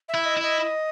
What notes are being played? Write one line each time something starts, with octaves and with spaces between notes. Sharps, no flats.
E5
E4
D#5
E4
D#5